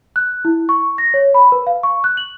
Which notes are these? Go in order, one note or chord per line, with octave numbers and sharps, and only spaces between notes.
F#6
E4
C#6
A#6
C#5
B5
B4
F5
C#6
F#6
F#7